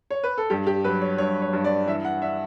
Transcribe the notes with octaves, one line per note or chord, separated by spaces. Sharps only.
C#5
B4
A4
G2 G4
G4
F#3 B4
C#5
G2 C#5
C#5
G2
D5
E3 E5
F#5
D4 E5